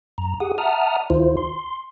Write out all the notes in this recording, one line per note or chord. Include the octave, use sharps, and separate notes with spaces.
F#2 A#5
G4 G#4 F#5 D#6
E5 F#5 A5 A#5 D#6 F6
D2 D#3 E4 F4 C5
C6